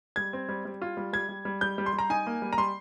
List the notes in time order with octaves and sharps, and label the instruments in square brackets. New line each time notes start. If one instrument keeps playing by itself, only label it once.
[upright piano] G3 G#6
C4
G3
G3
F4
G3
G3 G#6
G3
G3
G3 G6
G3
C6
G3
A#5
D#4 G#5
A#3
G3
A#5
G3 C6